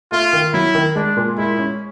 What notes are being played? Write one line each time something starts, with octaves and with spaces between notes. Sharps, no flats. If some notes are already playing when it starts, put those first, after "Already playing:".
A3 F4
D#3
F#3 E4
D#3
G#3 D4
A#2
G#3 E4
C#4